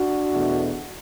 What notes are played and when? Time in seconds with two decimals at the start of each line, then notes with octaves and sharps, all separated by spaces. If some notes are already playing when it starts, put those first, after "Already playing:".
Already playing: D4 F#4
0.33 E2 B2 A3